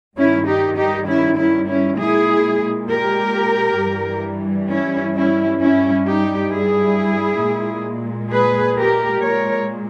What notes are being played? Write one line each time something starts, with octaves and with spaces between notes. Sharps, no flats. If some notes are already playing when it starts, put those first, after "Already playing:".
G2 D#3 G3 C#4 E4
D#4 G4
D#4 G4
C#4 E4
C#4 E4
C#4 E4
A#2 G#3 E4 G#4
G4 A#4
G2 E3 G3
C#4 E4
C#4 E4
G2 G3 C#4 E4
D#4 G4
E4 G#4
A#2 G#3
G#4 B4
G4 A#4
A#2 G#3 A#4 C#5